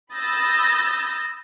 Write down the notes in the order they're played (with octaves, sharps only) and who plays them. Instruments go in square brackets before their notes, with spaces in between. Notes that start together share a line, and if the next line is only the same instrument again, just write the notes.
[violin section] B5 D#6 E6 G6 A6 A#6